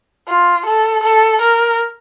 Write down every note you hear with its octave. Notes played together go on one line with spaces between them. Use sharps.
F4
A4
A4
A#4